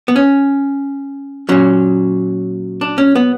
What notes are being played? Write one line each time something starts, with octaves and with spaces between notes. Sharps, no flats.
B3
C#4
A#2 F#3 C#4
D4
C#4
B3